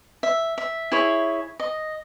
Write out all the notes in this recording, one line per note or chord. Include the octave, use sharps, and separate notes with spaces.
E5
E5
E4 G#4 C#5
D#5